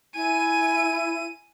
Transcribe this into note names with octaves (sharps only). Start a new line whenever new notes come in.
E4 G#5 D#7